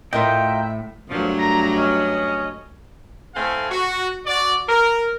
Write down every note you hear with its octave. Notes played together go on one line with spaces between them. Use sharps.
A2 F4 A#4 D#5 E5 G5
G2 A#2 F3 F#3 A3
A#5
C#4 D#5
A2 A3 C4 F5 G#5
F#4
F#4 D5
A#4